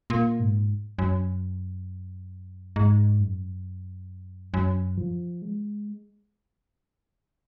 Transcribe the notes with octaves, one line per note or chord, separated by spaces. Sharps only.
A#2
G#2
F#2
G#2
F#2
F#2
F3
G#3